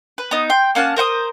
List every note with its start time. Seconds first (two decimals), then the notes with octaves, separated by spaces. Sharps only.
0.18 B4
0.31 B3 D#4
0.50 G5 C6
0.75 A#3 C#4 F#5 A5
0.96 A#4 C5 F#5 D#6